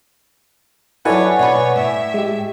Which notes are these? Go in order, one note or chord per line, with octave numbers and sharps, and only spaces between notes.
F#3 E4 A4 B4 C#5 D5 F#5 G#5
B2 B3 B4 C#5 D5
A2 E5
G#3 G4